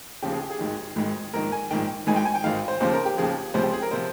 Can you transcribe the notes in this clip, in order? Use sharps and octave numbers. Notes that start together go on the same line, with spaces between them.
D#2 C#3 F3 G4
G#4
G4
G#4
G#1 G#2 D#3
G#1 G#2 D#3
A#1 G#2 D#3 A#4
G#5
A#1 G#2 D#3 G5
G#1 G#2 D#3 G#5
G5
G#5
G5
G#1 G#2 D#3 F5
C5
D#2 C#3 F3 C5
A#4
G4
D#2 C#3 F3 G#4
C#2 C3 F3 C5
G4
G#4
A#4
C3 F3 C5